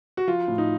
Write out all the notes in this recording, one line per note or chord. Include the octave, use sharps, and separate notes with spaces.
F#4
F3 F4
A2
D#4